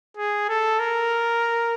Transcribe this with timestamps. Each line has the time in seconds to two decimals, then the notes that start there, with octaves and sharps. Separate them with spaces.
0.17 G#4
0.49 A4
0.79 A#4